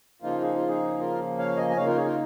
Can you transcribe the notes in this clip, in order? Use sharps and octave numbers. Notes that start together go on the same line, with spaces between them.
C#3 F3 A#3 D#4 F4
G#4
F4
D#4 G#4
F4 A#4
C#5 F5
D#5 G#5
G#5
C#3 A#3 D#4 C#5 F5
F4 A#4
G#4 C#5
F4 A#4